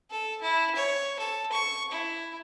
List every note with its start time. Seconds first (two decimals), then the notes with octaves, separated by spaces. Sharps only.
0.10 A4
0.41 E4
0.75 C#5
1.19 A4
1.52 C#6
1.92 E4